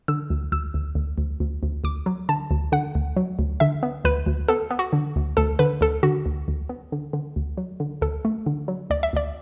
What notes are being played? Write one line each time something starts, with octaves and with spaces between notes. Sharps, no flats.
D3 E6
D2
D2 E6
D2
D2
D2
D2
D2
D2 D6
F#3
D3 A5
D2
D3 F#5
D2
F#3
D2
D3 E5
B3
D2 B4
D2
B3 A4
B3
F#4
D3
D2
D2 A4
D3 B4
D2 A4
D3 F#4
D2
D2
B3
D3
D3
D2
F#3
D3
D2 A4
A3
D3
F#3
D2 D5
E5
D2 D5